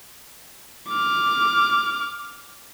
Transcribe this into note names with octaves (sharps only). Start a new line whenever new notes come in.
D6 F6